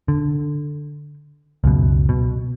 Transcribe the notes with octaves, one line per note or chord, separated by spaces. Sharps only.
D3
C#2 F#2 B2
B2